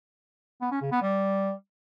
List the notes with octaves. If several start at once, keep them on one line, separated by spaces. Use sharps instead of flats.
B3
C#4
C#3
B3
G3